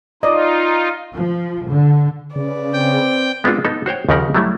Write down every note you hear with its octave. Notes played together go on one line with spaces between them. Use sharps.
D#4 F4 D5 D#5
F3
D3
C#3 B4 D5
C4 G5
G#3 B3 C4 D4 F4 F#4
B3 D#4 A4
F#4 C5 C#5 G5
D#2 C#3 F3 G4 A#4 F#5
F#3 G3 A3 E4